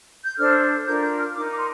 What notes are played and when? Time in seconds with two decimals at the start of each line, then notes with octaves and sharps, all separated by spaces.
0.24 G6
0.37 D4 A4 C5 F6
0.86 D4 F4 A#4 G6
1.02 G6
1.18 F6
1.34 D#4 A#4 D6
1.51 D6
1.59 C6